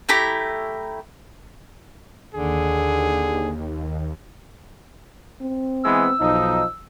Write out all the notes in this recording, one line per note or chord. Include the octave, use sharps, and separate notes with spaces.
A3 E4 G4 A#5
D#2 D3 G#4
C4
E3 G#3 B3 E6
B1 F3 D#4